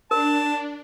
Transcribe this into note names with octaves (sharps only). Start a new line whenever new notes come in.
D4 A#4 A5